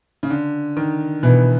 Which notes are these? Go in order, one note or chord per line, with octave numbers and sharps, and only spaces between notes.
C#3
D3
D#3
B2 E3